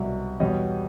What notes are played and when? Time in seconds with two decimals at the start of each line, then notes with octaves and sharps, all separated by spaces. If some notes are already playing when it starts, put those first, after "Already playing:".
Already playing: C2 B2 F#3 D5 E5
0.40 E2 B2 G3 C#5 D#5